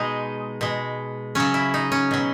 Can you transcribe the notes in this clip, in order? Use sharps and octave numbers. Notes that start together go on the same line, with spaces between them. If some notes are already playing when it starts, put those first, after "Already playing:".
Already playing: B2 G#3 D#4
B2 G#3
C#3 F#3 C#4
E4
D#4
C#4
B2 F#3